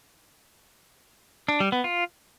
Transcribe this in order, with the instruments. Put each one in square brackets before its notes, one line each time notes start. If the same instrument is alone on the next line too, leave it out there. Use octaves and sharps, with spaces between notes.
[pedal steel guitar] D4
G3
B3
F4